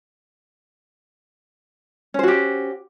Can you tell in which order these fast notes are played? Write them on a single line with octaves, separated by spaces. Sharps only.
C#4 C5 F#4 G4